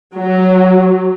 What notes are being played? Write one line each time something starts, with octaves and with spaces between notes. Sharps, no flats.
F#3